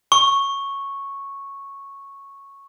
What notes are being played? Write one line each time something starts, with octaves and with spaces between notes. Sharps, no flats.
C#6